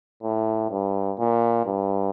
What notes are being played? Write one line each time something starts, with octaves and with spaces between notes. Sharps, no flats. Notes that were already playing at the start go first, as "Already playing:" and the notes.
A2
G2
A#2
G2